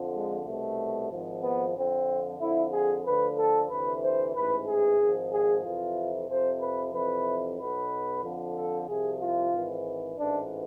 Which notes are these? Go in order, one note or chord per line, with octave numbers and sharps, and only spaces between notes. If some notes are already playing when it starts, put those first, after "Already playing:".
Already playing: F2 D3 F3
G#3
C2 B2 A3
G#1 G#2 F3
B3
F2 D3 F3 C4
F2 D3 F3 E4
G#4
D2 D3 F3 B4
A4
D2 C3 E3 B4
C5
A1 G#2 E3 B4
G#4
G#1 G#2 F3
G#4
F2 C3 E3 F4
F2 C3 F3 C5
B4
F2 C3 E3 B4
B1 B2 B4
F2 D3 F3
A4
C2 C3 F3 G#4
F4
G#1 G#2 E3
A1 G#2 E3 D4